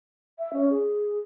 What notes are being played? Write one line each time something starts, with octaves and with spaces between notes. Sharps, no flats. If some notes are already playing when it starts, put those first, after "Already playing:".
E5
C#4
G#4